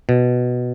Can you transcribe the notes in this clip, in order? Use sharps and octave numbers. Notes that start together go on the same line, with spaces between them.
B2